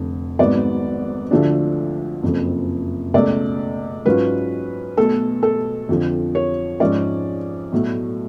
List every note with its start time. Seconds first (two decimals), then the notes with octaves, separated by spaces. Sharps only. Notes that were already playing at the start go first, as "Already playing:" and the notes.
Already playing: F1 F2 D3
0.39 G#1 G#2 F#3 B3 D5
1.31 D2 D3 F3 A3 D4
2.23 F#1 F2 F3
3.14 C#2 B2 A3 D5
4.06 G#2 F#3 C#4 F4 B4
4.97 B1 B2 A3 A4
5.43 A4
5.89 F2 D3 F3
6.35 C#5
6.80 G#2 F3 G#3 C#4 D5
7.72 B1 A2 F#3 A3